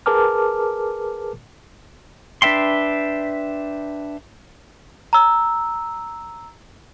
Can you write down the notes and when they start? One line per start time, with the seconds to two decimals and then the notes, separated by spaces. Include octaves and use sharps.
0.06 G#4 A#4 B4 A5 D6 F6
2.42 D4 B4 E5 G5 C6
5.13 A#5 E6